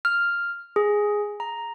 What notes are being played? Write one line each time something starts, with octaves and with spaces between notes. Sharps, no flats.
F6
G#4
A#5